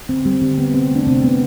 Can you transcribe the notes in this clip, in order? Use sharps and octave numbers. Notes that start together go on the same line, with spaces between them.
D3 C4
G3 C4
D3 C4
B3
C3 C4
A3 D4
C3 C4
F3 B3